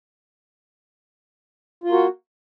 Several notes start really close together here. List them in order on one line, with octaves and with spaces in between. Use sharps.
F4 A#3 F#4